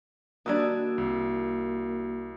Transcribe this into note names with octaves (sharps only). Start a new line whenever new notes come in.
D#3 G3 A#3 D4 F#4 D#6 E6 G#6
C2